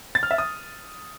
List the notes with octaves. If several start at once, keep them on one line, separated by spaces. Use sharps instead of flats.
A6
F6
E5
D#6